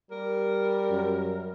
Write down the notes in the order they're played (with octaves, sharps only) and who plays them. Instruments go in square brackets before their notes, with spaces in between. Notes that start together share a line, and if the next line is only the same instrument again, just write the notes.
[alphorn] G3 [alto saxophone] A#4
[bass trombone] F#2